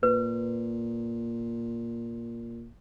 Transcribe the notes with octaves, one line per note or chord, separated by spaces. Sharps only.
A#2 B4